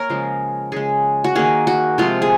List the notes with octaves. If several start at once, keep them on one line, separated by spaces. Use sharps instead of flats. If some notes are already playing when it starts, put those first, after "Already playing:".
Already playing: A#3 A#4 C#5
C#3 F3 G#3
C#3 G#3 G#4
F#4
D#3 A#3 G#4
F#4
C3 F3 G#3 F4
G#4